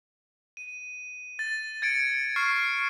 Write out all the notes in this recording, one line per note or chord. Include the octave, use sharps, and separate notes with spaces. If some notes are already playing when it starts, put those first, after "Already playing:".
D#7
A6
G#6 A6 C#7 D7
C#6 F6 C7